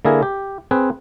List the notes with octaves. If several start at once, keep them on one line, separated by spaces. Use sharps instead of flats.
D3 A#3 E4 G#4 A#4
G4
C4 G#4 B4